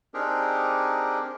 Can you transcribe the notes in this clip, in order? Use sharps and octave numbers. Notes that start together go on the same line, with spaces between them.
C4 D4 D#4 G4 G#4 A#4